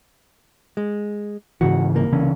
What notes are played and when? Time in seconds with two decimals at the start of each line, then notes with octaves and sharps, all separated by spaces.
0.77 G#3
1.61 G#2 C#3 E3 F#4
1.95 C2 A#3
2.13 C#3 E3 C#4